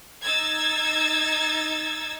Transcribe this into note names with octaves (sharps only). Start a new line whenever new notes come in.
D#4 E6 G#6 A6